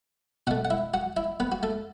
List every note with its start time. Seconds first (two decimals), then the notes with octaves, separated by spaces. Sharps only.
0.47 B2 F#4 F#5
0.51 A3
0.65 F#5
0.70 E4 E5
0.94 F#4 F#5
1.17 E4 E5
1.40 B3 B4
1.52 F#4
1.63 A3 A4